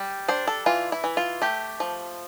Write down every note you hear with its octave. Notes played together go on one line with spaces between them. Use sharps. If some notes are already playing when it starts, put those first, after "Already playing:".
Already playing: G3
D4 C5
A4
E3 F4
E4
E3
F4
A3 G4
F3